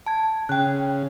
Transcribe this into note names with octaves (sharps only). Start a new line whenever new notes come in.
A5 G#6
C#3 G5 F#6